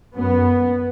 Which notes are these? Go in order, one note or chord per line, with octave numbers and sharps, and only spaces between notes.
F#2 B3